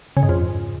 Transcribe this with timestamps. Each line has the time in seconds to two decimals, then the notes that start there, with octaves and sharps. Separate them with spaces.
0.17 C#3
0.23 G#2
0.29 F2